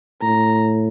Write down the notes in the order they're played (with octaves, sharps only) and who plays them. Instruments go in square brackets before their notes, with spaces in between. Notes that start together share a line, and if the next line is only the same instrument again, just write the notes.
[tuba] A2 [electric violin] A#5